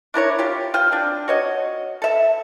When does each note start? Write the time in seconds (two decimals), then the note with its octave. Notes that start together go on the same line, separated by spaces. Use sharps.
0.14 D4 E4 A#4 C#5
0.39 F4 G4
0.74 F4 G5
0.92 C4 D4
1.28 F#4 C#5 D#5
2.02 A4 E5